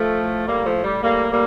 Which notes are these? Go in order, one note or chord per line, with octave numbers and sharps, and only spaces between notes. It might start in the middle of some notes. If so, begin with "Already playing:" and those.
Already playing: F3 A3
A2
A2 G3 A#3
F3 A3
A2
G3
A2 G3 A#3
A2 G3 A#3